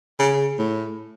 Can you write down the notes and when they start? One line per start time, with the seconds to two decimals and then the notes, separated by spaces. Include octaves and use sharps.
0.19 C#3
0.59 A2